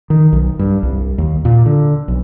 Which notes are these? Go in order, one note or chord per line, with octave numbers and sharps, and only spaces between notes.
D#3
B1
G2
C2
D#2
A#2
D3
B1